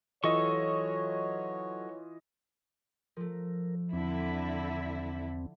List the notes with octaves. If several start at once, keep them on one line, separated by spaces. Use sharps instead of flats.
E3 F#3 F4 A4 C#5 D#5 C#6
F3 A3 A#4
E2 D3 C4 E4 E5